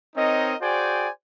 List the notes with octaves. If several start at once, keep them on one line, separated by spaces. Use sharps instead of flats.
C4 D#4 A#4 C#5 D#5
F#4 G#4 C5 D5 G5 G#5